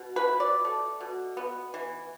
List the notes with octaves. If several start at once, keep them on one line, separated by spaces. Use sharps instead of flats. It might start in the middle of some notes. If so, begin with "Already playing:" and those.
Already playing: B2
B4
E4
D5
A3
B2
B3
E3